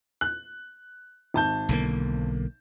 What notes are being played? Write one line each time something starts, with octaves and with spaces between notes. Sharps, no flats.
F#6
G#1 A5 G6
B1 D3 A#3